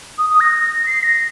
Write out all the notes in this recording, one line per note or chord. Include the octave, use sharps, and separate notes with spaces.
D#6
D#6
A#6
C7
A#6